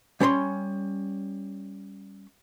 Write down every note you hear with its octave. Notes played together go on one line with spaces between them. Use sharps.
G3 C#4 C#5 B5 C6